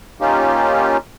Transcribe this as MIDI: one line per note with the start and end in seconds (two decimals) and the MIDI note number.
0.21 0.97 58
0.21 0.97 61
0.21 0.97 63
0.21 0.97 65
0.21 0.97 67